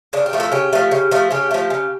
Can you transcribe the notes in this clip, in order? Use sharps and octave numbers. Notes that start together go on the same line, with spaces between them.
C#3 D4
G4
F3 A3
A4
C#3 G4
F3 A3
C#3
F3 A3
C#3 G4
F3 A3
C#3